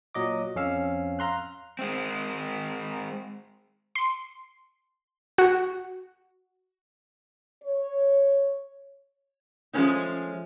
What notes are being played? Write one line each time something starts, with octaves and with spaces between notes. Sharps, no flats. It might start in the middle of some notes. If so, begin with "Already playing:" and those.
A#2 F#3 D#5 D6
F2 C#4 F5 E6
F5 A#5 C6 F#6
G#3 C4
C6
F#4
C#5
F3 G#3 A3 B3 C#4 D#4